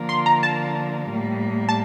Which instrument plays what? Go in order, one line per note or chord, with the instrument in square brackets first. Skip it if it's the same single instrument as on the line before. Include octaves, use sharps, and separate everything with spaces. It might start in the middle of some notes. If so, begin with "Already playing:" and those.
Already playing: [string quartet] D3 F3 A#3 F4 A#4
[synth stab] C6
A#5
A5
[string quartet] A2 G3 A#3
[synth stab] A5